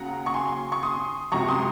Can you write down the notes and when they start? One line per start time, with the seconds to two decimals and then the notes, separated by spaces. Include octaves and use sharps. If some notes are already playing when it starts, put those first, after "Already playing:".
Already playing: D#2 C#3 F#3 F#5 A#5
0.26 C#6
0.34 G#5 C6
0.72 C#6
0.83 C6 D#6
1.32 C#2 C3 F#3 A#5 C#6
1.48 C6 D#6